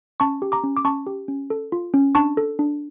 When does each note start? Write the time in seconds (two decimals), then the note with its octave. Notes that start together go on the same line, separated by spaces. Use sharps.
0.20 C#4 A5 C#6
0.42 G4
0.52 A#5 D6
0.64 C#4
0.77 D6
0.84 C#4 A5 C#6
1.07 G4
1.28 C#4
1.50 A4
1.72 F4
1.94 C#4
2.15 D4 A5 C#6
2.37 A4
2.59 D4